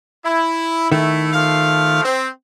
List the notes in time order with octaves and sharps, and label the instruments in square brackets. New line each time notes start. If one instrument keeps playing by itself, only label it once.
[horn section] E4
[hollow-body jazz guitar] D#3 [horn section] A3 E4
[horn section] F3 A3 F5
C4